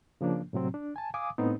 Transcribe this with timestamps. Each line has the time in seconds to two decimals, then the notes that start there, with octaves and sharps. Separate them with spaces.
0.21 C#3 F3 A#3 D4
0.53 A2 C3 F#3 C4
0.74 D4
0.96 G#5 A5
1.14 F5 G#5 D6 D#6
1.38 A2 B3 C4 D#4